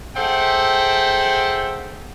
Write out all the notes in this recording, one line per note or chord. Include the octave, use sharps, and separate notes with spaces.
G#4 A4 C5 E5 F#5 G5